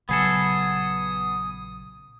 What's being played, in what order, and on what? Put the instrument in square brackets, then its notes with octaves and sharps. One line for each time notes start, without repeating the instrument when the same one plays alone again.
[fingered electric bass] A#1 C#3 F#3 [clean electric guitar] B3 G#4 A4 [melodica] D#6